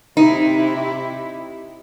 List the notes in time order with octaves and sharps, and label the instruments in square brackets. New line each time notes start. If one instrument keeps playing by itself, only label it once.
[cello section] C3 E4 G4 [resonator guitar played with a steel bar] D#4